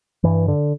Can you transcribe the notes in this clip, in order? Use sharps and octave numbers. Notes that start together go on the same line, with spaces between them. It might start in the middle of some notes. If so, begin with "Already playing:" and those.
G2 E3
D3